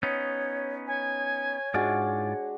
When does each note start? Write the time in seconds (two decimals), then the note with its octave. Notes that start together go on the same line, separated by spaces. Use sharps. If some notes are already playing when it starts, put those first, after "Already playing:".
0.03 B3 C#4 D#4 C#5
0.87 C#5 G#5
1.74 G#2 G#3 D4 F4 F#4 D5